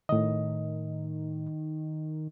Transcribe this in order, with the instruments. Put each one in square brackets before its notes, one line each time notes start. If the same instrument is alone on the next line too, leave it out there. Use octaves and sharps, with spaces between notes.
[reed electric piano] A2 D#5 [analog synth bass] D#3